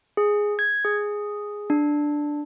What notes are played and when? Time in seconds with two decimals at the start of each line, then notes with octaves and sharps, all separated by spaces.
0.17 G#4
0.59 G#6
0.85 G#4
1.70 D4